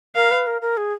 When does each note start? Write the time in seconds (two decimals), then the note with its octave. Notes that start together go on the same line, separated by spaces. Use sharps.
0.15 A#4 F5
0.31 B4
0.47 A#4
0.62 A#4
0.77 G#4